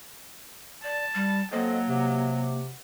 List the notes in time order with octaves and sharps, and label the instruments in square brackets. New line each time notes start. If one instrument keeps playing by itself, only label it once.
[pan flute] D5 [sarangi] A5
[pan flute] G3
[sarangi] F#3 [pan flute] A#3 [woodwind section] C4 A4 D#5
[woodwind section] C3